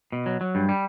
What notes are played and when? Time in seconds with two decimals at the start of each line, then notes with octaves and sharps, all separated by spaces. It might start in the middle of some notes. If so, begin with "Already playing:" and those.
0.12 B2
0.26 F#3
0.41 F#3
0.55 G2
0.69 G3